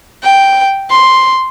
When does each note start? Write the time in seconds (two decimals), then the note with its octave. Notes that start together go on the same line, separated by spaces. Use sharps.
0.24 G5
0.90 C6